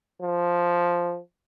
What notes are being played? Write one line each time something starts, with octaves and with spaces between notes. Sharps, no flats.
F3